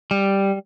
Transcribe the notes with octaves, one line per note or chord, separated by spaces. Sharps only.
G3